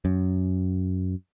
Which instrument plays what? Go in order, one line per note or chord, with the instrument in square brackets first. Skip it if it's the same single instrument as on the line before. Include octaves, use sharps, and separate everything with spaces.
[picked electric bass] F#2